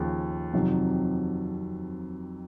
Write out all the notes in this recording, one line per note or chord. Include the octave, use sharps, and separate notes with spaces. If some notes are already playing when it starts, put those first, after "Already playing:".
Already playing: D#2 C#3 F3
F2 C3 D#3 F#3